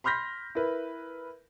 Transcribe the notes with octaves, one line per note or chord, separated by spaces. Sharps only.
B5 C6 F6 G6 A#6 B6
E4 A#4 B4